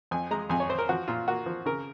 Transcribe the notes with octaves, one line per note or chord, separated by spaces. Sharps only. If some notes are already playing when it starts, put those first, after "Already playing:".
F2 G#5
G#3 A#5
F2 G#5
C#5
C4 C5
A#4
F3 F#4
A#2 F4
A#3 F#4
F3
C#3 A#4